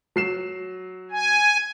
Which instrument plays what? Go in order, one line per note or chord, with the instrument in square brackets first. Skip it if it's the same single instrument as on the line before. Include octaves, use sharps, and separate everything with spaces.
[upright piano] F#3 C7 E7
[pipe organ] G#5